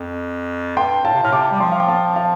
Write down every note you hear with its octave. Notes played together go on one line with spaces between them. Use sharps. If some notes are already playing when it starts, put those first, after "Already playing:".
Already playing: F2
G2 G5 C6
A2 F5 A5
C3
A2 F6
C3 A5 D6
G3
F3 G5 C6
F5
G5
F5 A5
F5 A5